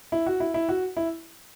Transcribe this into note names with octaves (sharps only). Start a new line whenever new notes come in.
E4
F#4
E4
E4
F#4
E4